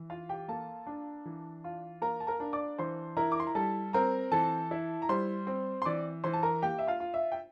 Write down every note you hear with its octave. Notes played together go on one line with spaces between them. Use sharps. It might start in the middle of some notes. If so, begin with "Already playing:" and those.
Already playing: E3
F4 F5
G4 G5
A#3 A4 A5
D4
E3
F4
A#3 A#4 A#5
A5
A#4 A#5
D4
D5 D6
E3 C5 C6
E4 A#4 A#5
D6
C6
A#5
G3 A4 A5
C4 A#4 A#5
E3 A4 A5
E4
A#5
G3 C5 C6
C4
C6
E3 D5 D6
E3 C5 C6
A5
A#4 A#5
A#3 G4 G5
E5
F4 F5
F4
E5
G5